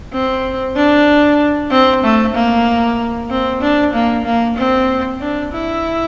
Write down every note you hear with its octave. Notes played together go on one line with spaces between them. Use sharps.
C4
D4
C4
A3
A#3
C4
D4
A#3
A#3
C4
D4
E4